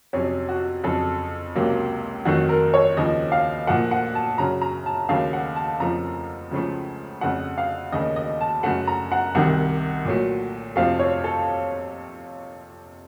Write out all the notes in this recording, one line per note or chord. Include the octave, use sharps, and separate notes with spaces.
F2 C3 F#3 C#4
F#4
F2 C#3 F#3 A4
C#2 C3 F#3 A#3
F2 D#3 F#3 A3 F#4
A#4
C#5
D#2 C#3 F3 D#5
F5
A#2 F3 A3 F#5
F#5
A5
F#2 C#3 F#3 A#5
A#5
A5
D#2 C#3 F#3 A3 F5
F#5
A5
F2 C#3 F3 A3 A#5
C#2 C#3 F3 A3
F2 C#3 A3 F#5
F5
D#2 C#3 A3 D#5
D#5
A5
F#2 C#3 A3 F#5
A#5
F#5
C2 C3 D#3 F#5
A#2 F#3 A3
F2 C3 F3 A3 F5
C#5
A4